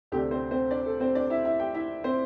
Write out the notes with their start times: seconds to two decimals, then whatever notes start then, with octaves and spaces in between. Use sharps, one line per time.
0.12 D2 C3 A3 D4 G4
0.31 C4 C5
0.51 C4 C5
0.71 D4 D5
0.86 A4
1.00 C4 C5
1.15 D4 D5
1.30 E4 E5
1.45 E4 E5
1.60 G4 G5
1.75 E4 E5
2.04 C4 C5